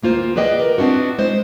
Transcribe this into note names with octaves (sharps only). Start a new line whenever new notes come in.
D2 A#3 F4 C5
B3 G#4 B4 D5 D#5 G5
A#4
B3 C4 D4 E4 F#4
G#3 E4 C5